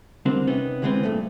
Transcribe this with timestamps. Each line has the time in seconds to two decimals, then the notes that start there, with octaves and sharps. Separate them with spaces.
0.25 D3 G3 C4 D4 A#4
0.47 C3 B3 C#4 D#4
0.82 D3 E3 G#3 B3 C4
1.03 G2 A#2 A3